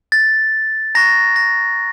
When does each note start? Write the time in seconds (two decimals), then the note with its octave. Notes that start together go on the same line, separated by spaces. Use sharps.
0.12 A6
0.95 A#5 C#6 F#6 A#6
1.36 A#6